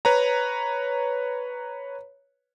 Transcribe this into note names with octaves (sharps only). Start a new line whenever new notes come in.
B4 C#5 A#5